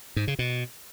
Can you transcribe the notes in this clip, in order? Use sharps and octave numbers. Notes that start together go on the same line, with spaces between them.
G#2
C#3
B2